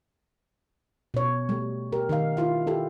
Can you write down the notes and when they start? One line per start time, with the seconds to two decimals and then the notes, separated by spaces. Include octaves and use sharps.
1.14 B2 C#5
1.49 G3 A3
1.92 G4 A#4
2.09 D#3 D#4 A#4 F5
2.37 E4 F4 F5
2.67 E4 G4 A4